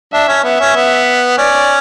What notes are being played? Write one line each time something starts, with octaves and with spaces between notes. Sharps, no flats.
D4 E5
C#4
B3 E5
C#4
B3
C#4 D5